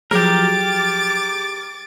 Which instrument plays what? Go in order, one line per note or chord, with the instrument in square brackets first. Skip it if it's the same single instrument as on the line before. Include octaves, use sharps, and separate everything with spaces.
[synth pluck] F3 F#3 [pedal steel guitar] G4 A#4 [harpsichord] G#4 [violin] D6 A6